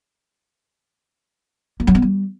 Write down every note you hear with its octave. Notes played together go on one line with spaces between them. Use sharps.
A#3
F#3
B3
G3